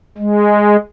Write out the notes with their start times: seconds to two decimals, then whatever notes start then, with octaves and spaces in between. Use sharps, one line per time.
0.18 G#3